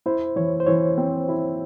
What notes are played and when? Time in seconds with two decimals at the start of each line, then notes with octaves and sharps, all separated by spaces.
0.06 E4 C5
0.36 E3 C#5
0.60 C5
0.67 E3 C#5
0.98 C4
1.29 E4